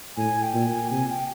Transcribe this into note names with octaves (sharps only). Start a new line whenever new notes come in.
A2 G#5
G5
A#2
G#5
C3 G#5
G5